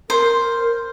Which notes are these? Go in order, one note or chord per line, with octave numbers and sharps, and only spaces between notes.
A#4 C5